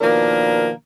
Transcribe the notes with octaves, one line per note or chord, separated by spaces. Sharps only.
B2 D#3 F3 A#3 D4 A#4